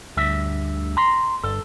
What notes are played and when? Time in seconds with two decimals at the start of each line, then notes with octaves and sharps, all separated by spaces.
0.17 D2 G2 E5
0.97 A#5 C6
1.43 G1 A4